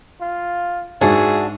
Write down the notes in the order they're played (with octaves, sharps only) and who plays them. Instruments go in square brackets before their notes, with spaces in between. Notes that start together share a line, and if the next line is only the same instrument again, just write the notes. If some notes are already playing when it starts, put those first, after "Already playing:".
[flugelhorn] F4
[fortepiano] G#2 [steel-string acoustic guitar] D4 F#4 [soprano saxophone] G#4 [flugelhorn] E5